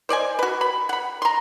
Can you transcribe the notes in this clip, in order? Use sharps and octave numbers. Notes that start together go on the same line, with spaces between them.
C5 D5 D#5 G#5
F#4 B4
B5
F#5 B5
A#5 C6